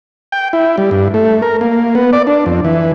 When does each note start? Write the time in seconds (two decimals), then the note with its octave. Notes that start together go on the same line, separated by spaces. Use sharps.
0.32 G5
0.53 E4
0.78 G3
0.91 G2
1.14 A3
1.42 A#4
1.61 A#3
1.95 B3
2.13 D5
2.27 D4
2.46 F2
2.65 E3